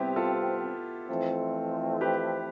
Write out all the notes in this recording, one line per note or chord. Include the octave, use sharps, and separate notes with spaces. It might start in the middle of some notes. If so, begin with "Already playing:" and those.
Already playing: C3 G3 B3 C4 E4 G4
F4 A4
F2 E3 A3 C4
G4 B4